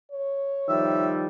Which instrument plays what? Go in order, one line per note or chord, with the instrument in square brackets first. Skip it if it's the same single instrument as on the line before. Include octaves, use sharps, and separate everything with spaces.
[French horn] C#5
[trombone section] D#3 F3 G3 [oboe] E5